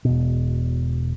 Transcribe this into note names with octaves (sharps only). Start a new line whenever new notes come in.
E1 B2